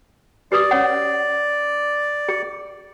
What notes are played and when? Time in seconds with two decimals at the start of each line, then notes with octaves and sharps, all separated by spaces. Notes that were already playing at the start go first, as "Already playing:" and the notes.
0.52 G4 B4 D5 D#6
0.71 C#4 C#5 F#5
2.29 G#4